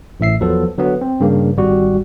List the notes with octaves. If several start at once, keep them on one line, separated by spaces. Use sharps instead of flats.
A1 A2 E5 C7
E2 F3 F#3 B3 A4
D3 F#3 B3
C4
G2 C#3 A#3
G#1 G3 F#4